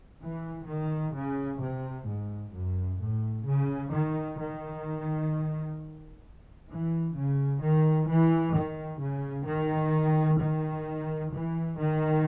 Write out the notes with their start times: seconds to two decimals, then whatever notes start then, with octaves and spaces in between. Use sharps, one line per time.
0.22 E3
0.68 D#3
1.14 C#3
1.61 C3
2.07 G#2
2.53 F#2
3.00 A2
3.45 C#3
3.92 D#3
4.39 D#3
6.70 E3
7.16 C#3
7.62 D#3
8.08 E3
8.55 D#3
9.01 C#3
9.47 D#3
10.39 D#3
11.32 E3
11.79 D#3